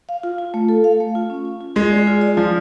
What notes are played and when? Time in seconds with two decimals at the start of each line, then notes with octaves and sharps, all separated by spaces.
0.09 F5
0.23 F4
0.38 F4
0.54 A3
0.69 A4
0.84 F5
1.00 A3
1.15 F4
1.30 C#4
1.45 F4
1.61 F4
1.76 G#3 G#4
1.92 D5
2.07 F4
2.21 D5
2.37 F3 F4